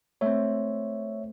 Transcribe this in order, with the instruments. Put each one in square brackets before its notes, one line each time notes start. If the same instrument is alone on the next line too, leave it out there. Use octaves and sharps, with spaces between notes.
[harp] A3 C4 [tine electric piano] C#5 E5